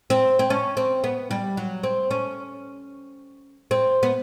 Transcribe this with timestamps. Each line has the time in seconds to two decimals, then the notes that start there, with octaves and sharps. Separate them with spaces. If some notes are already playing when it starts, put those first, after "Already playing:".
0.10 C4
0.39 C4
0.50 C#4
0.77 C4
1.04 B3
1.31 G3
1.57 F#3
1.83 C4
2.11 C#4
3.71 C4
4.03 B3